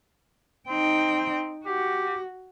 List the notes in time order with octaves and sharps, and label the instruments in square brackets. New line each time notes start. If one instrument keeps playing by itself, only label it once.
[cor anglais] C4 [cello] D#4 G5
[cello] F#4 [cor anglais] G4